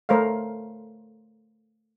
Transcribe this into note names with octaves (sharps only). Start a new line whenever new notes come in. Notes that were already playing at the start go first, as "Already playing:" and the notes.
A3 A#4 C5 C#5 F5